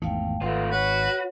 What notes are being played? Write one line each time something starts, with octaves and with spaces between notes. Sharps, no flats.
G#1 E2 D#3 A3 F5 G5
G#1 A3 F4 B4 F#5
F#4 B4 C#5